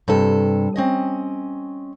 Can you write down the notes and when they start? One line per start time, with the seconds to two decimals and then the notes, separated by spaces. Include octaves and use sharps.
0.08 G2 C3 A4
0.76 C4 C#4 D#5